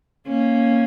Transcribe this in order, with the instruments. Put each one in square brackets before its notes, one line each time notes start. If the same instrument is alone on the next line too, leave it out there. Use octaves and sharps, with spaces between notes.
[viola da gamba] A#3 C#4